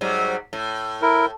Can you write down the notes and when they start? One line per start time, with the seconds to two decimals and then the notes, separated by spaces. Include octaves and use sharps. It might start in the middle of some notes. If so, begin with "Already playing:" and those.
0.01 G#2 F#3 G3
0.53 A2
1.02 E4 A#4